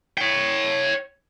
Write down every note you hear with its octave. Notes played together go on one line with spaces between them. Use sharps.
C#5 G5